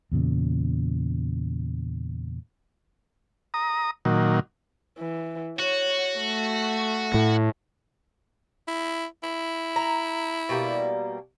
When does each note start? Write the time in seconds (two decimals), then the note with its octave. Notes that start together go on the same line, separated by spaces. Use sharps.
0.12 E2 A#2 C#3
3.54 A#5 D#6
4.05 A#2 D#3 F#3
4.98 E3
5.59 F#4 C#5
6.19 A3
7.14 A2
8.68 E4
9.23 E4
9.76 A#5
10.49 B2 G3 A#3